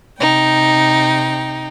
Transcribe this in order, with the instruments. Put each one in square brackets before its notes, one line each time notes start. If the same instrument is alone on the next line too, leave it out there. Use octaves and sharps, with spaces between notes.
[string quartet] C3 D#4 G5